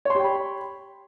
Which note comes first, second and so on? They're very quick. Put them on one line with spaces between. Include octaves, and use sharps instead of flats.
C#5 C6 G4 G5 B5